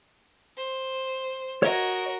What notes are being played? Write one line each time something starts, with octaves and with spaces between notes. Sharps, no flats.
C5
F#4 A#4 C#5 D#5